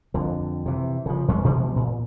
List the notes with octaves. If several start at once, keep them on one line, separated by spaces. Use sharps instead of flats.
F2 D3
C3 E3
C#3 F3
E2 G#3 C#4
B2 E3 F3 G#3
A#2